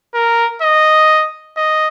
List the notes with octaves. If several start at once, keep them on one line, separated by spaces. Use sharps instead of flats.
A#4
D#5
D#5